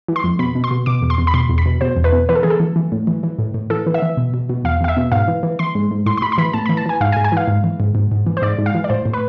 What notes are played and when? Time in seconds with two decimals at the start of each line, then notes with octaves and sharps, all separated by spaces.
0.08 E3
0.16 C6
0.24 F2
0.39 B2 B5
0.55 B2
0.64 C6
0.71 B2
0.86 B2 D6
1.02 E2
1.10 C6
1.18 E2
1.27 B5
1.34 B2 C6
1.49 E2
1.58 B5
1.66 B2
1.81 B2 C5
1.97 E2
2.04 B4
2.12 B2
2.29 E3 B4
2.35 A4
2.43 E3 G#4
2.50 A4
2.60 E3
2.76 E3
2.92 A2
3.07 E3
3.23 E3
3.39 A2
3.54 A2
3.70 E3 A4
3.87 E3
3.94 E5
4.02 E3
4.17 B2
4.34 B2
4.49 B2
4.64 E2 F5
4.81 E2 F5
4.88 E5
4.97 B2
5.12 G#2 F5
5.28 E3
5.43 E3
5.59 E3 C6
5.75 G#2
5.91 G#2
6.06 A2 C6
6.17 C6
6.22 A2 B5
6.32 C6
6.38 E3 B5
6.53 A2 A5
6.66 E3 B5
6.77 A5
6.86 E3 G#5
7.01 G#2 F5
7.12 G#5
7.17 G#2
7.24 G#5
7.32 E3 F5
7.48 G#2
7.64 E3
7.80 G#2
7.95 G#2
8.12 G#2
8.27 E3
8.37 C5
8.42 G#2 D5
8.58 G#2
8.66 F5
8.75 E3
8.84 D5
8.90 A2 C5
9.06 A2
9.13 B4